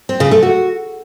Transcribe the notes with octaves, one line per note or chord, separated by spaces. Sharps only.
C4
C#3
A3
F#4